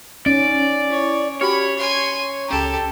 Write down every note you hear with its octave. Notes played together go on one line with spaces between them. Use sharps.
C#4 D#4 D5
E4 C#5
F#4 G4 C#5 B5 F6
G#5 C6 C#6
C#2 C#4 G4 A4 A#5